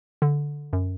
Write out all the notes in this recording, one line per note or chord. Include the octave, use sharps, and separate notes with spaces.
D3
F#2